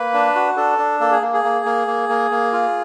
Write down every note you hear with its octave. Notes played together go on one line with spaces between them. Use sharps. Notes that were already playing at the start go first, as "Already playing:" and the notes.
Already playing: A#3 B4
D4
F#4
D4 A4
D4
A#3 A4
G#4
A#3
G#4
A#3
A#3
A#3
A#3
A#3
F4